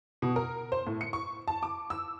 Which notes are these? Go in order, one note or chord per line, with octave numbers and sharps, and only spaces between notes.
B2
A#4
C5
A2
C#7
C#6
A5
D6
E6